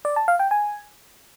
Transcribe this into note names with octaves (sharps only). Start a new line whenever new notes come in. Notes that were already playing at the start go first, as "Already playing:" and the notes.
D5
A5
F5
G5
G#5